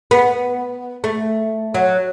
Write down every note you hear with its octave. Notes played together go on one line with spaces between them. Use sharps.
B3
A3
F#3